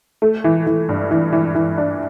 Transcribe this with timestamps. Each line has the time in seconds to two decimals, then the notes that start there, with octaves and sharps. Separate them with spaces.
0.22 A3
0.44 E3
0.67 E3
0.89 G2
1.11 E3
1.33 E3
1.55 E3
1.78 D4